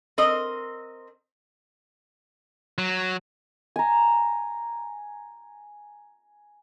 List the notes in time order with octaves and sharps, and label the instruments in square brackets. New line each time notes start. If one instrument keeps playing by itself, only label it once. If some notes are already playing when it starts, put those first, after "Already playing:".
[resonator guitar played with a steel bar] C4 A#4 D#5
[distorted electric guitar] F#3
[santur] G#5 A#5